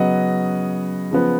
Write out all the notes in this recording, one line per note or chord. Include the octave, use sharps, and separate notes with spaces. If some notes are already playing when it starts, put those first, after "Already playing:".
Already playing: C#3 F#3 B3 D#5 F#5
C#3 F3 B3